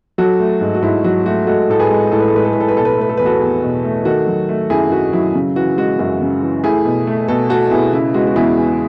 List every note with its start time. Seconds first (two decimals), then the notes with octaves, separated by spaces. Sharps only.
0.18 F#3 F#4 A4
0.40 A3
0.61 G#2
0.74 F#4
0.82 G#2 E4
1.04 F#3 F#4
1.26 A3 F#4
1.47 G#3 F#4 A4
1.69 A2 A4
1.79 G#4 B4
1.90 G#3
2.12 A2 A4
2.20 B4
2.28 A4
2.33 G#3 B4
2.45 A4
2.53 A2 B4
2.60 A4
2.68 B4
2.76 B2 A4
2.85 B4
2.93 A4
2.98 A3 B4
3.09 A4
3.17 E2 B4
3.26 F#4 A4
3.41 E2
3.62 B2
3.84 A3
4.05 D#3 F#4 A4
4.27 F#3
4.49 A3
4.70 F#2 E4 G#4
4.92 D#3 F#4
5.13 F#3 E4
5.35 C#3
5.56 E3 F#4
5.77 G#3 F#4
5.99 F#2 F#4
6.21 C#3
6.42 E3
6.64 A3 E4 G#4
6.85 B2
7.07 A3
7.28 B2 F#4 A4
7.50 A3 F#4 A4
7.71 B2 E4 G#4
7.93 C#3 E4
8.14 G#3 F#4
8.27 F#4
8.36 E2 E4 G#4
8.58 E2